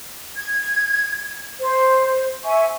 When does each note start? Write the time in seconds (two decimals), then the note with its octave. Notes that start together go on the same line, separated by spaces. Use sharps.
0.37 G#6
1.59 C5
2.44 E5 G#5 C#6